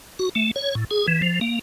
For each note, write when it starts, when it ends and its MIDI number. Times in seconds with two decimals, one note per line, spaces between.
0.19 0.29 66
0.35 0.51 57
0.56 0.75 73
0.75 0.85 45
0.91 1.07 68
1.08 1.21 52
1.22 1.40 53
1.41 1.59 58